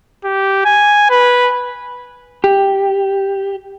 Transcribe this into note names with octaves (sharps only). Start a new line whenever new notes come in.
G4
G#5
B4
G4